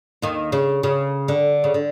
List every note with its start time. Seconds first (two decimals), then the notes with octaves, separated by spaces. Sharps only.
0.22 D#2 D#3
0.52 C#3
0.83 C#3
1.28 D3
1.64 C#3
1.74 D3